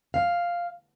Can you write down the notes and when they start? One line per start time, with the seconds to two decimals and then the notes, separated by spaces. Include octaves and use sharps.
0.14 F5